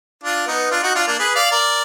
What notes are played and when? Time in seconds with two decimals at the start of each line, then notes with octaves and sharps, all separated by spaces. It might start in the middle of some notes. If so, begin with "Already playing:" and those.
0.23 D4 F4
0.47 B3 D#4
0.71 D4 F4
0.83 D#4 F#4
0.95 D4 F4
1.07 A#3 D4
1.19 G#4 B4
1.35 D5 F5
1.51 A#4 D5